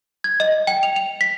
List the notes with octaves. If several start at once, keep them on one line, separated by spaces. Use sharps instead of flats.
G#6
D#5
G5
F7
F7
B6